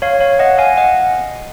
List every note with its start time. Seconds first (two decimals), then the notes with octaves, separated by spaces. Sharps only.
0.02 C#5 F5
0.20 C#5 F5
0.39 D#5 F#5
0.58 F5 G#5
0.77 D#5 F#5